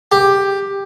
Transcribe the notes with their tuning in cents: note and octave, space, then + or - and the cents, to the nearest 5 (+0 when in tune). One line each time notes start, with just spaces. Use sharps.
G4 +10